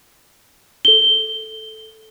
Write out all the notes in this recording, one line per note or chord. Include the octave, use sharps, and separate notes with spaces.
A4 G7